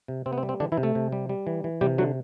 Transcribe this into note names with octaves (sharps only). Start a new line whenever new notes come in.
C3
C3 C4
B3
C4
G3
C4
D3 E3 D4
E3 E4
C3
A3 A4
C3
G3
G3
E3
E3
C3 G3 G4
D3 F#3 F#4